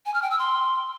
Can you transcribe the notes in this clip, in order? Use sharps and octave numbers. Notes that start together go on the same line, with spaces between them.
G#5
F6
G5
E6
C6